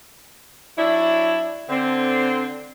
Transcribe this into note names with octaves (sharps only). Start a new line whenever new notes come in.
F#3 D4 E4
D3 C4